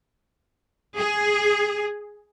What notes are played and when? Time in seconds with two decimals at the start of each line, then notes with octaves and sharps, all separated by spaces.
0.97 G#4